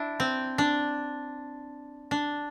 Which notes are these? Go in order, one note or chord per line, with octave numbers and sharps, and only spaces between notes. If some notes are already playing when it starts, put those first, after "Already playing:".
Already playing: D4 E4
C4
D4
D4